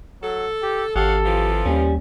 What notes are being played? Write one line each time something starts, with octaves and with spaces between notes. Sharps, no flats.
F#3 A4
G4
G#1 G4 A4 C#5 F5 F#5
E3 F3 F4
D#2 G3 C#4